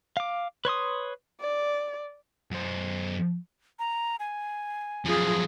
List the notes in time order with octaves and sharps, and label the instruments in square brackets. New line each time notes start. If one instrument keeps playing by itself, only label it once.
[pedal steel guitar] F5 D6
B4 C#5 C6 D#6
[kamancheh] D5
[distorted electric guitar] F#2 C5
[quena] A#5
G#5
[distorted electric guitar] F#2 F3 [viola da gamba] F4 G#4